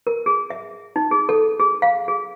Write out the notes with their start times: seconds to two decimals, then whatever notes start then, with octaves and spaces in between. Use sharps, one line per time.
0.07 A#4
0.26 G#4
0.50 E5
0.96 D#4
1.11 G#4
1.29 A4
1.60 G#4
1.82 F5
2.08 G#4